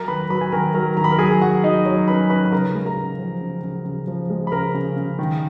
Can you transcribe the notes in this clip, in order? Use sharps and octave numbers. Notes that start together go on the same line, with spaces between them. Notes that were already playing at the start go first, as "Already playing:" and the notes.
Already playing: F#3 A#4 A#5
D#3 B4 B5
F#3 B4 B5
G#5
D#3 A#4 A#5
F#3 A#4 A#5
D#3 A#5
B5
A#4 A#5
F#3 G#4 G#5
F#3 F#4 F#5
F#3 D#4 D#5
F#3 C#5
C#4 B4 B5
C#4 B4 B5
B5
C#3 A#4 A#5
G#3
A#4 A#5
C#3
F3
C#3
C#3
C#3
F3
G#3
B5
C#3 A#4 A#5
C#3
C#3
D#3